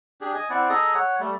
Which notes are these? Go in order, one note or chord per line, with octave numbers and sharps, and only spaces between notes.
D4 G4 G#4
D#5 G#5
C4 E4 D5 F#5
G#4 A4 D#5 A#5
C#5 F#5
G3 A3